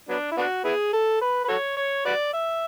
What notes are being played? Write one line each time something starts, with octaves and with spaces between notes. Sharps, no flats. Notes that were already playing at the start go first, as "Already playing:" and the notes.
F#3 B3 D4
E4
B3 D4 F#4
B3 E4 G#4
A4
B4
B4
F#4 A4 C#5
C#5
F#4 B4 D5
E5